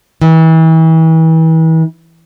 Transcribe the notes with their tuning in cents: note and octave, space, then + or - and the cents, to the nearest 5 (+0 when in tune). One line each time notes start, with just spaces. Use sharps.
E3 -35